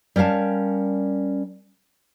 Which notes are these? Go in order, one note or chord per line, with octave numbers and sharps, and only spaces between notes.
G3 C#4 A#4 F5 A5